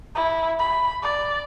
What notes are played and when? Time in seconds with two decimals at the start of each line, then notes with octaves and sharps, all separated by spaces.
0.16 E4
0.59 B5
1.03 D5